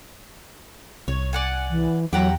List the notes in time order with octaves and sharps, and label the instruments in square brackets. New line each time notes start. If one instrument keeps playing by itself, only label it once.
[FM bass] C2 [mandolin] C#5
[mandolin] D5 F#5 G#5
[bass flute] E3
[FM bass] E2 [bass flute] F#3 [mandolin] G4 F#5 A#5